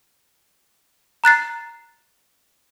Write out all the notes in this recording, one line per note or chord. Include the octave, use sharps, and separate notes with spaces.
A#5 F#6 A6 C7